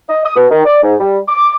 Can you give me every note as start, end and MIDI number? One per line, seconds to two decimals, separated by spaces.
0.09 0.21 75
0.25 0.34 87
0.36 0.46 47
0.50 0.64 51
0.65 0.83 74
0.83 0.95 44
1.00 1.19 55
1.28 1.56 86